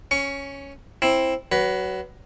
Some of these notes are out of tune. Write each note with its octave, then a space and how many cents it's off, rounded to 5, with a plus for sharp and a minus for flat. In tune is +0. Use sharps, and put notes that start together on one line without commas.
C#4 +0 C#6 +20
C4 +10 E4 +0
F#3 +25 B4 +0